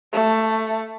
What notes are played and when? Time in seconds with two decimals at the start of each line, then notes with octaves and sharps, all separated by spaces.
0.13 A3